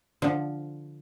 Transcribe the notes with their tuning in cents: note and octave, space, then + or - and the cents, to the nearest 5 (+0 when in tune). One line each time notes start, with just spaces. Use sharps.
D3 +0 F3 +0